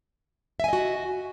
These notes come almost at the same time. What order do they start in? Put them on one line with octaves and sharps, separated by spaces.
E5 G#5 D#5 F#4